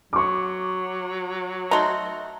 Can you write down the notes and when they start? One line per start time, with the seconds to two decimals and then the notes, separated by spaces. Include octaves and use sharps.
0.13 F#3 C#6 D6
1.71 A3 D#4 F#4 A#5 C6